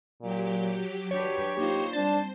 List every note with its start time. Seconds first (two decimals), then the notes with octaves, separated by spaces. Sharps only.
0.22 A#2 F#3 G4
1.11 F#3 D4 G4 B4 C#5
1.57 A#3 D#4 F4 G4 C5
1.93 G3 C4 D4 A5